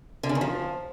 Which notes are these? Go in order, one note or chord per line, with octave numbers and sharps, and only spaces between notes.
D3
C#3
D#3
F3